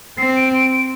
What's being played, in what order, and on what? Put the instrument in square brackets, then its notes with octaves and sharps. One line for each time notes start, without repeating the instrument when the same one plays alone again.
[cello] C4 [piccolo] C7
[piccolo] D7
D7
D7